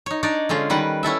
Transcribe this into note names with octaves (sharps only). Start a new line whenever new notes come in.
D#4 C#5
D4 D#4 C#5 D5
D3 G#3 C#4 F4
D#3 G3 B4 F#5
C#4 E4 A4 E5